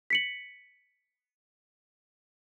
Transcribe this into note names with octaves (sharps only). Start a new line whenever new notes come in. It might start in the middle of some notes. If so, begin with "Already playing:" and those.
B6 C#7 F#7